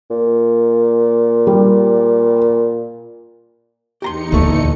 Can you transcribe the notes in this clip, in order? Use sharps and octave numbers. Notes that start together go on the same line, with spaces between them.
A#2
G3
E2 D#4 G4 A#5 C6 C#7
D2 A#2 A3